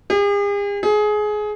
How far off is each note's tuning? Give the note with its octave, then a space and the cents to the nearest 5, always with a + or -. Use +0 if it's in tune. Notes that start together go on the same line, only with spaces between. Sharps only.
G#4 -45
G#4 +20